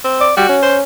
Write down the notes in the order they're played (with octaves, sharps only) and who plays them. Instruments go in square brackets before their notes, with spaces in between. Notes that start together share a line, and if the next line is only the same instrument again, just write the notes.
[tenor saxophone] C4
[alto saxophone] D5
[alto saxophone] G3 [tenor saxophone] F#4
[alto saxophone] C#4
[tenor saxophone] C5